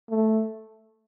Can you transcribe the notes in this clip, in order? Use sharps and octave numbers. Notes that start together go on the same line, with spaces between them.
A3